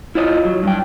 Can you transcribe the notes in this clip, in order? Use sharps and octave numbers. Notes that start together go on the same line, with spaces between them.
E4 F4 C#5 D#5
F#3
G2 G5